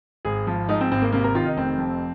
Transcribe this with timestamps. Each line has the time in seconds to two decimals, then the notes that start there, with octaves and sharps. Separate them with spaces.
0.25 G#1 G#4
0.47 F3
0.69 G#2 D#4
0.81 C4
0.91 G#1 C4
1.02 A#3
1.12 C3 A#3
1.24 A#4
1.34 D#3 F4
1.46 D#4
1.57 F1 C4
1.78 F2